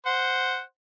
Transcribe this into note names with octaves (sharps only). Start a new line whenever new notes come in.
C5 F#5